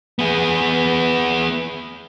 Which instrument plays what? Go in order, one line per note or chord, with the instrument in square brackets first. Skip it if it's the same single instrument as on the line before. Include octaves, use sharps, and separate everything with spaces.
[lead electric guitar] B3 G#4